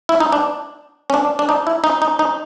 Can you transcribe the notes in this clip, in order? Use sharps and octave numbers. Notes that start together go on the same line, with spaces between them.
E4
D#4
D4
C#4
D4
D4
D#4
E4
D#4
D#4
D#4